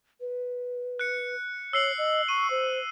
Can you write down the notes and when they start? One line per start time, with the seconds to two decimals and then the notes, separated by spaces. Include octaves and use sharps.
0.20 B4
0.99 F#6 C#7
1.73 C#5 E6 C7 F#7
1.98 D#5
2.28 C#6 D#7
2.51 C5